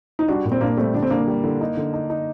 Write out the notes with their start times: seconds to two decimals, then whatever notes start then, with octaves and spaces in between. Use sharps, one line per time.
0.19 D#4
0.28 G3 D4 F#4
0.45 A#2
0.52 C4
0.61 A#2 A#3 D4
0.77 G3 A3 C4
0.94 D3 D4
1.02 C4
1.10 D3 A#3 D4
1.28 G3
1.44 D3
1.61 D#4
1.77 D3
1.94 D#4
2.10 D#4